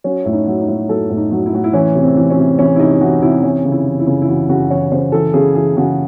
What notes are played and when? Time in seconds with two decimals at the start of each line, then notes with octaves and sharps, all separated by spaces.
0.04 F#3 C#4
0.25 A2 E4
0.33 D#4
0.47 F#3
0.61 D#4
0.68 A2
0.89 F#3 A4
1.10 A2
1.17 D#4
1.32 F#3
1.46 E4
1.53 A2 F#4
1.64 E4
1.73 E3 C#4
1.95 C3
2.02 C4
2.17 E3
2.30 C#4
2.37 C3
2.58 E3 C#4
2.76 E4
2.80 C3 D#4
3.01 E3 F#4
3.22 C3 E4
3.43 E3 C#4
3.65 C#3
3.72 E4
3.86 E3
4.00 E4
4.06 C#3
4.22 E4
4.28 E3 F#4
4.49 C#3 F#4
4.70 E3 C#5
4.92 C#3 C5
5.12 E3 A4
5.33 C#3 G#4
5.55 E3 G#4
5.77 C#3 F#4